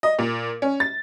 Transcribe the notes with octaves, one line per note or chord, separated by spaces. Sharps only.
D#5
A#2
C#4
A6